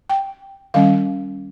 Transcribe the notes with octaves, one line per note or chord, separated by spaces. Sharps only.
G5
D#3 G3 C#4 F5